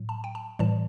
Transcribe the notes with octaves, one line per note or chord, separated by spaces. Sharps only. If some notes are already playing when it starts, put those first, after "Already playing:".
Already playing: A2 F#3
A5
G5
A5
A2 E3 G3 A5